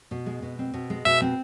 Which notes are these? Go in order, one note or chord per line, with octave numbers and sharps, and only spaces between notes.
B2
G#3
B2
C4
B2
G#3
B2 E5
C4